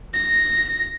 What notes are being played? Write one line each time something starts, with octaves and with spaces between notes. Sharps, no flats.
A#6